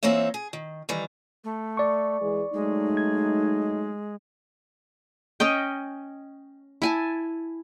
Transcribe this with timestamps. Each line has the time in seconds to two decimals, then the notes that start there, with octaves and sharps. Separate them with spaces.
0.03 E3 A#3 C4 D#4 C#5 E5
0.34 G#4
0.53 D#3
0.89 D#3 E3 G3
1.44 A3
1.77 D5 C#6
2.20 E3 G#3 G#4
2.54 F#3 G#3 A3 D#4
2.97 G#6
5.40 C#4 C#5 D#5 G5
6.82 E4 G#5 A5